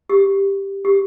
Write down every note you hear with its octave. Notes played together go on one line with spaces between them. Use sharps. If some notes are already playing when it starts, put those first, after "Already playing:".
G4
G4